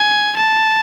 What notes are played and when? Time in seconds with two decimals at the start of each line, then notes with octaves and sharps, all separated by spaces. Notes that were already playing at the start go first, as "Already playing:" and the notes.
Already playing: G#5
0.36 A5